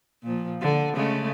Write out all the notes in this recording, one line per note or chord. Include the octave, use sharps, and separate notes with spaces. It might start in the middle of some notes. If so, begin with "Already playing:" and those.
A#2 F3
D3
C#3 G#3 A3